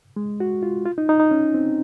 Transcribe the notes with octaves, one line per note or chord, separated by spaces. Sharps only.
G#3
F#4
F4
F4
D#4
D#4
D#4
C#4
C4